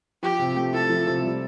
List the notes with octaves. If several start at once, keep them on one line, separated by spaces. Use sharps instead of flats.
F3 G4
C3
A3
E4 A4
F3
C3
G3